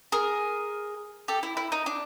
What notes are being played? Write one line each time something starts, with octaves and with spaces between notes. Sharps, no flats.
G#4 A#4
G4 A4
E4
E4
D#4
D4